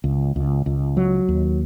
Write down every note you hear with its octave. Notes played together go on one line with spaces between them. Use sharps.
C#2
C#2
C#2
F#3
D#2